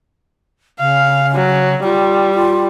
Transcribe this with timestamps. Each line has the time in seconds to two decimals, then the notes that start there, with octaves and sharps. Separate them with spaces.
0.80 C#3 F5
1.34 F#3
1.83 G3 F4
2.34 F4